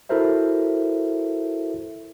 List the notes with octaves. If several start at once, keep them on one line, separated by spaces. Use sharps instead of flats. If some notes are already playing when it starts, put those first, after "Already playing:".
E4 F#4 A4 A#4 C5 E5